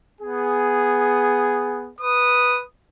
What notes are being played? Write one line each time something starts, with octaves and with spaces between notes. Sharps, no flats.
B3 G#4
B4 D#6